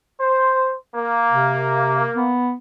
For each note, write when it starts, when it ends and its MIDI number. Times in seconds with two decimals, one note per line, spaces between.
0.20 0.75 72
0.95 2.35 58
1.29 2.08 48
2.16 2.54 59